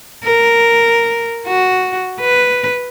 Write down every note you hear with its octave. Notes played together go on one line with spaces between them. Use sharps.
A#4
F#4
B4